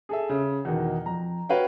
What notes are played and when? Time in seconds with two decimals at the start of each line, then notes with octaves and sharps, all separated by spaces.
0.09 G#4 A4 E5
0.29 C#3
0.65 E2 B2 D#3
1.06 F2 A#5
1.49 F#4 B4 C#5 F5 G5